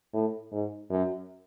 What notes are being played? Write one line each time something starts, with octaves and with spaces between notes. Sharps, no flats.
A2
G#2
F#2